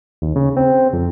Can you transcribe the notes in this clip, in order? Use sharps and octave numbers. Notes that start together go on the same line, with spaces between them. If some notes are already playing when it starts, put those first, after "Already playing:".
D#2
C#3
C4
F2